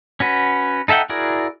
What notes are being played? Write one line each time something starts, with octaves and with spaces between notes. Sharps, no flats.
C#4 F#4 B4
D#4 A4 E5 F#5 G5
E4 F#4 G#4 A#4 D5